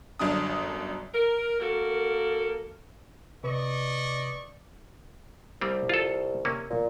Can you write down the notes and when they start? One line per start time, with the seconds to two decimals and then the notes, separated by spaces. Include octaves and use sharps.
0.19 G1 F#2 D4 D#6
1.14 A#4
1.60 A#3 F#4 A4 A#4
3.44 C3 B4 D5 D#5 C#6
5.61 C2 G3 C4
5.89 F4 A4
6.45 C3 A#3 C#4
6.70 A#2